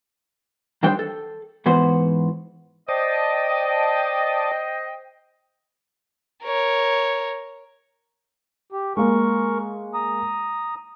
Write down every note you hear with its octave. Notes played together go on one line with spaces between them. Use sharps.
D#3 G3 D4 C5 G5
A4
G#2 E3 B3 F#4 C5
C5 D5 D#5 G5 A5 D#6
A#4 C#5
G4
G#3 A#3 A#4 C#6
A#5 D#6